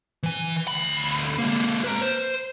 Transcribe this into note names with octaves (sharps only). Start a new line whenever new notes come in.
E3 G#5
D2 B5
G#3 A#3
B4 A#5
C5